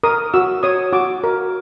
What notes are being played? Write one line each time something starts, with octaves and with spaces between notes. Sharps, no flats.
A#4 D#6
F#4 E6
C#5 D#6
F#4 D6
A#4